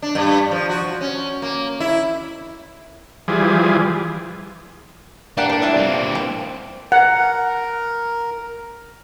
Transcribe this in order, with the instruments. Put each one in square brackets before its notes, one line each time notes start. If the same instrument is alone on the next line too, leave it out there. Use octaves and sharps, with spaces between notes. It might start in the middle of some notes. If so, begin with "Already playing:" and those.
[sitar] D4
G2
F3
F#4
C#4
A#3
E4
[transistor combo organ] E3 F3 G3 G#4
[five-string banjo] A#3 G4 F#5 [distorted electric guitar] D4
[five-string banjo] A#4 C5
G3 E4 F4
[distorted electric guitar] A#3 C4
[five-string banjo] C4
[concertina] A#4 [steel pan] F#5